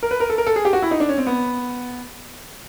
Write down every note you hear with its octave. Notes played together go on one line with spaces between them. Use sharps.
A#4
B4
A#4
A4
A#4
A4
G#4
G4
F#4
E4
D#4
D4
C#4
C4
B3